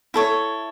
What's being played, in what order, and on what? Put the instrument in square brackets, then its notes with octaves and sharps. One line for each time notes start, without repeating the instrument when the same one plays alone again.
[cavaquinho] E4 A4 C#5